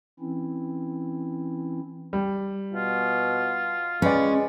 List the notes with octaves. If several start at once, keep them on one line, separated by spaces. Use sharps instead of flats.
E3 C4 C#4 E4
G3
B2 F4
G#3 C#4 B4 D5